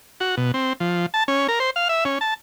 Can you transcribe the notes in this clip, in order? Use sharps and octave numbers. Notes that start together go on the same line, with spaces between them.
F#4
B2
C4
F3
A5
C#4
A#4
C5
F5
E5
C#4
A5